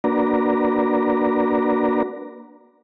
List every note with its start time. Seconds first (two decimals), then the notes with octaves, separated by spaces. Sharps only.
0.04 A#3 D4 F#4 B4 D5 A#5